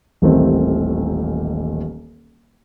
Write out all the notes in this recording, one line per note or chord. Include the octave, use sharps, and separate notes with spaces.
D#1 A1 D#2 D#3 A3 C4